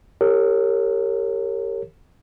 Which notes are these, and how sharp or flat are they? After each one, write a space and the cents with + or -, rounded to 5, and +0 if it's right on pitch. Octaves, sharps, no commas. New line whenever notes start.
G4 +10 A#4 -35 C#5 -15